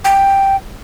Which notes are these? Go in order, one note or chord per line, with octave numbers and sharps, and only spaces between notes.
G5